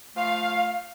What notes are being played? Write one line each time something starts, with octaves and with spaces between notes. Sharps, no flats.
F3 A3 F5